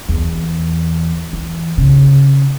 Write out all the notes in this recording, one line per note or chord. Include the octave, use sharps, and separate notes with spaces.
E2
E3
C#3